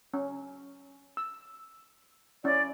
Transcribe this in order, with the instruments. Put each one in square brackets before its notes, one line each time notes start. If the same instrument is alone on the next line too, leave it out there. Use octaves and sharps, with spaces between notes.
[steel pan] C#4
E6
[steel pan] C#4 E4 [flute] D5